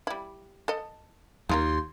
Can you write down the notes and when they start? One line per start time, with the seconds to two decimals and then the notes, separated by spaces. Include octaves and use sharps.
0.07 G3 E4
0.68 A4 D#5
1.49 D#2 D#4 F4 A#4 C6